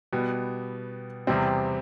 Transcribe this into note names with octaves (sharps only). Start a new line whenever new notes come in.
B2 G3 B3
E2 C3 G3 C4